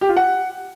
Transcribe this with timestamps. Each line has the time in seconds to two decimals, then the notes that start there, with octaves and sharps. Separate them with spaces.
0.01 G4
0.09 F4
0.17 F#5